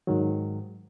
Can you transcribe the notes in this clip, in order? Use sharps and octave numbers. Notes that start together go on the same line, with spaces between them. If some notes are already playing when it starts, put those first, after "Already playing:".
G#2 D#3 F#3